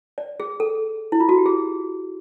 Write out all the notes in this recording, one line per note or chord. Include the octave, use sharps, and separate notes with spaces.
D5
G#4
A4
E4
F4
F#4
G4
G#4